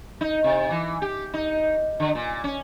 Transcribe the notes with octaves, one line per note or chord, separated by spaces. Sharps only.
D#4
C3
E3
G4
D#4
D3
A#2
C#4